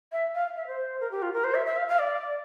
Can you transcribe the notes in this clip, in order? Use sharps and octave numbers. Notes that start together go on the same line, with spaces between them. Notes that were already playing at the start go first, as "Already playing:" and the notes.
E5
F5
E5
C5
A#4
G4
F4
A#4
C5
E5
E5
F5
F5
D5